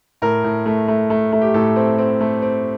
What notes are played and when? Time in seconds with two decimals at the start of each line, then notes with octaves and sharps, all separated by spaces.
0.22 A2 A#4
0.44 A2
0.66 A3
0.88 A3
1.10 A3
1.32 A3
1.42 G4
1.54 A2 A4
1.76 C4
1.98 C4
2.21 A3
2.42 C4